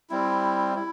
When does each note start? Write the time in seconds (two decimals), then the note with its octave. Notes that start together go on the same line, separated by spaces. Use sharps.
0.10 G3 C4 E4
0.75 E4